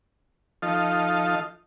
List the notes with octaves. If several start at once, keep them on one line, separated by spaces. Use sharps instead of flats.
F3 D#4 F4 A4 D#5 F5